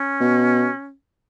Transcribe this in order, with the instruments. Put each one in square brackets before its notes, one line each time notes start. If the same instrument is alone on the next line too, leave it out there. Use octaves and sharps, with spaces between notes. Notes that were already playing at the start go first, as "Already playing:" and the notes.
Already playing: [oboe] C#4
[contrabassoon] B2